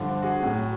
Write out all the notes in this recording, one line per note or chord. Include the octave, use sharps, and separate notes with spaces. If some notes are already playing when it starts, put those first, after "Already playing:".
Already playing: G2 D3 F3
F#4 G#4
A2 F#3